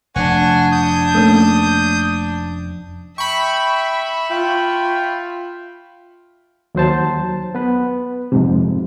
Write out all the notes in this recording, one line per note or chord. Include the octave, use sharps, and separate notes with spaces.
F1 D4 F#5 G#5 C#6
D#6 G6
A3 A#3 C#4
E5 G5 B5 C#6
F4 G5
D#2 F#3 C5 A5
B3 B4
F2 G#2 C3